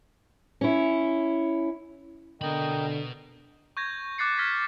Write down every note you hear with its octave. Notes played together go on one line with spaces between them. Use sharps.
C#4 E4
B2 D3 A#4 D#5 G5 B5
C#6 G6 G#6 A#6
D6 F#6 A6 C7 C#7
F6 G#6 A#6 B6